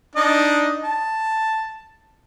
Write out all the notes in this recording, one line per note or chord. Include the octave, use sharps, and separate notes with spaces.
D4 D#4 D#5
A5